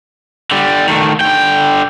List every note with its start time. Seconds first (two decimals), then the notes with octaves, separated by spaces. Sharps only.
0.51 D3 G3
0.88 D#3 A3
1.21 D3 G5